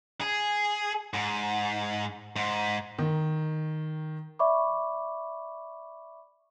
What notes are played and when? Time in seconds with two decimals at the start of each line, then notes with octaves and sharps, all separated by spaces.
0.21 G#4
1.14 G#2
2.36 G#2
2.99 D#3
4.39 D5 E5 B5 C#6 D6